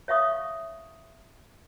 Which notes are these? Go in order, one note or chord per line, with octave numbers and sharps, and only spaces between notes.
C#5 E5 F5 C#6 D#6